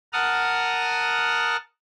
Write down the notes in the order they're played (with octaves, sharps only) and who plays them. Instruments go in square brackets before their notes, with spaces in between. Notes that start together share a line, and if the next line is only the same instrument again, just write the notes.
[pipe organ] A#4 F#5 A5 D#6 F6